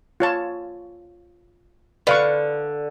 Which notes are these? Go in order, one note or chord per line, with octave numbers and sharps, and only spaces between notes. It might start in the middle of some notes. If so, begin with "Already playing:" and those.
F4 C#5 A5
D3 B4 F5 C#6